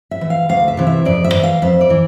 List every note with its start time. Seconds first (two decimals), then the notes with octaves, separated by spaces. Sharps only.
0.11 E5
0.21 E3
0.30 F5
0.49 D2 F5
0.68 E5
0.77 C3 E3
0.87 E5
1.05 F2 D5
1.24 E5
1.34 E3
1.43 F5
1.62 F2 E5
1.81 D5
1.90 E3